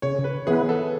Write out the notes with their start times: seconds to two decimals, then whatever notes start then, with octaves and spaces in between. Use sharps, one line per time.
0.02 C#3 C#5
0.24 B4
0.47 E3 B3 G#4
0.69 A4